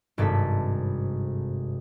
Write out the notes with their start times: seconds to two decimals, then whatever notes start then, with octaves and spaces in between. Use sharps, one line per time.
0.18 G#1 G2 C3 A4 B6